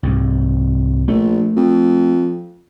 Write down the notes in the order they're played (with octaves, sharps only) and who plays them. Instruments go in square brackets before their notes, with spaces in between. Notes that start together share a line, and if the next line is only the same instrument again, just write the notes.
[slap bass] C2 G#2
[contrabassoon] A#1 [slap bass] A3
[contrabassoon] F2